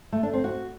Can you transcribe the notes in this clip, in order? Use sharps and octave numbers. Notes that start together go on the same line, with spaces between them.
A3
D4
C4
F#4